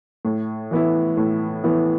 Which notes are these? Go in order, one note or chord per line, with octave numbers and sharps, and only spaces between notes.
A2
E3 B3 E4
A2
E3 B3 E4